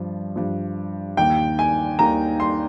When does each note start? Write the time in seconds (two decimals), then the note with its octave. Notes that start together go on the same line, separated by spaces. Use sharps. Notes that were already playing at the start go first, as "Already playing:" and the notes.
Already playing: G2 F3
0.36 G2 F3
1.17 D#2 D#3 G5
1.59 G#5
1.99 D#2 D#3 A#5
2.40 C6